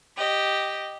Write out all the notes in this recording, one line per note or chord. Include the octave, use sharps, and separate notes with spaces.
G4 D#5